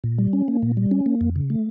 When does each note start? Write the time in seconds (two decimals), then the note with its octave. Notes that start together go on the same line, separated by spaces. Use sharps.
0.04 A#2
0.18 G3
0.33 C#4
0.48 A#3
0.62 A#2
0.77 G3
0.91 C#4
1.06 A#3
1.21 F2
1.36 C#3
1.50 A3